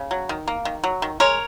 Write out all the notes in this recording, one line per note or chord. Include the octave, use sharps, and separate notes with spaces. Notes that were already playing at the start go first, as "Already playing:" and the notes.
Already playing: C#3
F#3
D#3
A#3
D#3
F#3
D#3
G#3 A#4 C#5